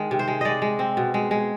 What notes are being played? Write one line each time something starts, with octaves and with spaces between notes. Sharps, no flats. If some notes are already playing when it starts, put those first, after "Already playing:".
Already playing: D#3 G#3
C3
C5
G#3
G#3 D5 D#5
G#3
C4
B2
G#3
G#3